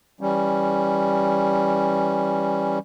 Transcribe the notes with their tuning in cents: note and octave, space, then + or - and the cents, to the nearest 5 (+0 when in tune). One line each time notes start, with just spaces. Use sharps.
E3 +0 G3 +5 C#4 +0